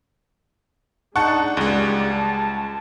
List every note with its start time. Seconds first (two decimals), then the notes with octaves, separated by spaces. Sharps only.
1.16 G#3 D4 D#4 F#5 A5 C#6
1.57 C#2 G3 G#3 G#4 D5
2.12 A5